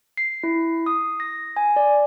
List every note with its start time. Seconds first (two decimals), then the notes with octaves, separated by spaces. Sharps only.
0.17 C7
0.44 E4
0.86 D#6
1.20 A#6
1.56 G#5
1.76 D5